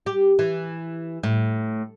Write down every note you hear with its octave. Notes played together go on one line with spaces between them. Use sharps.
G4
E3
A2